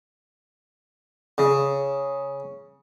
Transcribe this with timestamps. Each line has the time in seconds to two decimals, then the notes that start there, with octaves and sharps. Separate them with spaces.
1.38 C#3